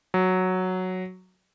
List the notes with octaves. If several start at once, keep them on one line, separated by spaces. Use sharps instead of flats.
F#3